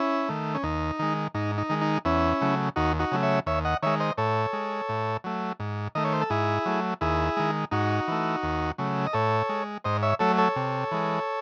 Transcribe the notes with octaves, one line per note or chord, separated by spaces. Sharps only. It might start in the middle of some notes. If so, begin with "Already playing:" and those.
Already playing: C#4 E4
D#3 A3
C#4
D#2 D#4
D#3 G#3
G#2 D#4
D#4
D#3 G#3
D#4
E2 C#4 E4
C#3 F#3 A3
D#2 D#4 F#4
D#4 F#4
C#3 F#3 A3
C#5 E5
D#2 C#5 E5
D#5 F#5
D#3 G#3 C#5 E5
C5 D#5
A2 A4 C#5
G#3
A2
F#3 A3
G#2
D#3 A3 D#5
C#5
C5
A4
G#2 E4 G#4
F#3 A3
D#2 E4 G#4
D#3 G#3
G#2 D#4 F#4
E3 A3
D#2
C#3 F#3 A3
D#5
A2 A4 C#5
G#3
G#2 C5 D#5
C#5 E5
F#3 A3 A4 C#5
A4 C#5
C3
E3 G#3